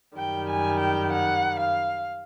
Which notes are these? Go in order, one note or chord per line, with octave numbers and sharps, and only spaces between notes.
F#2 D#3 G3 G5
G#5
G5
F#5
F5